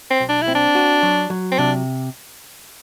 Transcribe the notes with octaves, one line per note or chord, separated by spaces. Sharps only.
C4
B1
D4
E4
C4
D4
F#4
F#3
F#3
C4
C3 D4